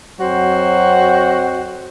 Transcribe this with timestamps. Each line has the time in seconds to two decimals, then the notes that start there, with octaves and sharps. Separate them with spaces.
0.20 F2 F#3 C4 F#4 C5